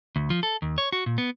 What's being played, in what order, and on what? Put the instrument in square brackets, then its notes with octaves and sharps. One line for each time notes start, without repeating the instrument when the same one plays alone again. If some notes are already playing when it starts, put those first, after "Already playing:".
[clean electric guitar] D2
F3
A4
D#2
C#5
F#4
A#2
B3